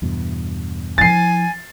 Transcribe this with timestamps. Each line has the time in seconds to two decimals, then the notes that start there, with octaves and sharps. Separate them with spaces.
0.02 E2 G2 B2
0.98 F3 E4 G#5 A6 C7